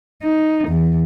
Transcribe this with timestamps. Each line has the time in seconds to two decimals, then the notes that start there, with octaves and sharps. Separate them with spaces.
0.23 D#4
0.68 E2